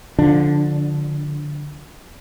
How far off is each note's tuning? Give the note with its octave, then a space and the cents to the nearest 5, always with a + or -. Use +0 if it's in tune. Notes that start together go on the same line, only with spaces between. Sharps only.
D3 +0 F3 +20 D4 +0